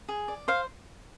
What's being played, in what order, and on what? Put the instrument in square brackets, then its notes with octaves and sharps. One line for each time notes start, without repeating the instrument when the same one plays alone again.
[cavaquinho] G#4
D5
C5 F5